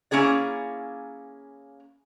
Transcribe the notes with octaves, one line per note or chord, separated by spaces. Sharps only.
A#3 C#4 E4 G#4 D5